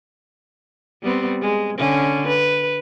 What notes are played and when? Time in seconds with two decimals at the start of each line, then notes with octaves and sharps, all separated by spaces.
1.02 G3 B3 C4
1.41 G#3
1.77 D3 C#4
2.27 B4